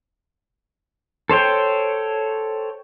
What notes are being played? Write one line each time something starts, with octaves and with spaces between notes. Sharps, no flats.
A4 C5 C#5 G5